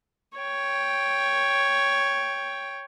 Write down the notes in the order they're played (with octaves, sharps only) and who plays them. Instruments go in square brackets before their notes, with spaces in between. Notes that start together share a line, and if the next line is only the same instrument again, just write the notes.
[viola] C#5 G5